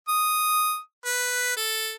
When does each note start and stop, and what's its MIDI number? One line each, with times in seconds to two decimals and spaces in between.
0.08 0.78 87
1.05 1.54 71
1.57 1.93 69